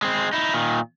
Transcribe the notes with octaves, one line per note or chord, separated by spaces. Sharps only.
G#3 C4
D#4 E4
A#2 D#3